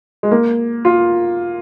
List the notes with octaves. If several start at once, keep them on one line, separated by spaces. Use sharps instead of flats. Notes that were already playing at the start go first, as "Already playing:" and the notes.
G#3
A#3
F4